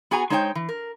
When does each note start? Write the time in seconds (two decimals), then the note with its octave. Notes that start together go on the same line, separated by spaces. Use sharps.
0.11 B3 F#4 G#4 G#5 A#5
0.30 G#3 D#4 C5 C#5 F#5 G5
0.55 E3
0.69 A#4